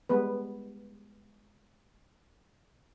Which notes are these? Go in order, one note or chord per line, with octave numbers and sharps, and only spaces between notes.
G3 G#3 B3 B4